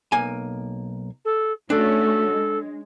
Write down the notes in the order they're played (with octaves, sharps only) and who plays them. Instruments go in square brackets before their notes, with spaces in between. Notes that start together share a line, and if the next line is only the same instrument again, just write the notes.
[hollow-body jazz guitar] B1 A#3 G#5
[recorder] A4
[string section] A3 C#4 F#4 [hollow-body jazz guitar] D4 [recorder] A4
[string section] G#3